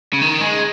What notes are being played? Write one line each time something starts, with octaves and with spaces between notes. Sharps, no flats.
C#3
D#3
G#3